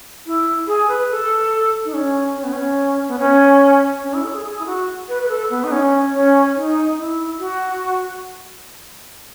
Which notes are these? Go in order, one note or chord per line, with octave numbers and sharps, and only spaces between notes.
E4
G#4
B4
A4
D#4
C#4
C#4
B3
C#4
B3
C#4
C#4
E4
A4
G#4
G#4
E4
F#4
B4
B4
A4
B3
D#4
C#4
C#4
D#4
E4
F#4